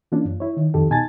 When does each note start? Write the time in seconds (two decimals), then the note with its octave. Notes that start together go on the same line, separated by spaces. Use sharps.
0.12 E3 A#3 C#4 D4 F4
0.25 F#2
0.40 E4 C#5
0.57 D#3
0.74 C2 F2 D#3 G4 A4
0.90 B2 D#4 G#5 A5 A6